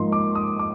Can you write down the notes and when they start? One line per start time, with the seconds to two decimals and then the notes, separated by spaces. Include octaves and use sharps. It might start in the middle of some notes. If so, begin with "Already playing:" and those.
Already playing: G#2 F3 A#3 D#4 C6
0.12 D6
0.35 D#6
0.59 D6